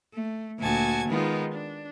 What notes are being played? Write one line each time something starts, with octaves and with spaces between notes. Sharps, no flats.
A3
D2 A#2 F#4 G#5 A5 G#6
D#3 G#3 B3 D#4 F4
D4